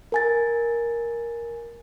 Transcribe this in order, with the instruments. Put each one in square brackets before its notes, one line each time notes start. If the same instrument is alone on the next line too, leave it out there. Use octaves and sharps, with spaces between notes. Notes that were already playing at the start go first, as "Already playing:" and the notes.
[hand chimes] A#4 G#5 A6